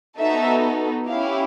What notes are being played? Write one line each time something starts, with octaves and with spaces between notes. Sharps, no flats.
B3 D#4 F#4 A4 E5
C#4 E4 G4 F5